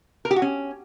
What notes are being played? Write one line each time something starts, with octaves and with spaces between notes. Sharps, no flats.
A#4
G4
F#4
C#4